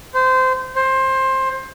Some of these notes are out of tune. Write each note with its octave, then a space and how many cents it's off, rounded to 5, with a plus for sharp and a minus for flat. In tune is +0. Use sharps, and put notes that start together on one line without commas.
C5 -20
C5 +20